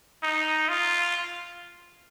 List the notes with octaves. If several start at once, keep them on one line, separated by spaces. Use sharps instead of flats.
D#4
F4